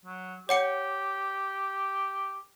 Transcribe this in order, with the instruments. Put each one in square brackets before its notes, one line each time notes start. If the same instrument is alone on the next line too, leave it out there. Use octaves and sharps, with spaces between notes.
[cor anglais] F#3
[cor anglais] G4 [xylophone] C#5 F#5 C#7